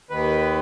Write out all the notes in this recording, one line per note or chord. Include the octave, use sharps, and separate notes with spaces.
D#2 D#3 B4